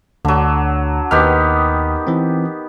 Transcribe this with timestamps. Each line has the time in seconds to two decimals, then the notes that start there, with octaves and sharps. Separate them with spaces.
0.25 D2 D3 F#3
1.11 D#2 D#3 B3 G4 F6
2.07 E3 C4